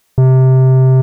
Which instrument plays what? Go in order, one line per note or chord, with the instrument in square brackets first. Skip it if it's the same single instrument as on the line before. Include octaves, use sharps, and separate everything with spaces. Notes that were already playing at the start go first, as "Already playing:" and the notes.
[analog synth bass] C3